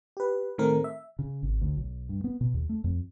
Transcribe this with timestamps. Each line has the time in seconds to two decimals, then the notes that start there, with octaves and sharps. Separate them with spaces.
0.17 G4 B4
0.58 A2 D#3 A3 C4 A#4
0.84 E5
1.19 C#3
1.43 G#1
1.61 D2
1.77 B1
2.09 G2
2.24 B3
2.41 B2
2.54 D#2
2.69 A3
2.84 F2